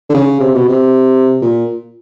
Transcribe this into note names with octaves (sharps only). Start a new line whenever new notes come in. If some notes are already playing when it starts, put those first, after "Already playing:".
D3
C#3
C3
B2
C3
A#2